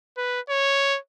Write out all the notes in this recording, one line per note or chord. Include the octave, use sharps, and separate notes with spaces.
B4
C#5